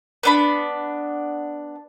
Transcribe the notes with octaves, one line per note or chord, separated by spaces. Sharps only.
B3 D4 B5